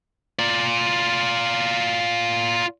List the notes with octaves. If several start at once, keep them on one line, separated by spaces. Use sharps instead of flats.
F4 D5